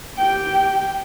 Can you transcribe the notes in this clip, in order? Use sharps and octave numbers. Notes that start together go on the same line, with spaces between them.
G4 G5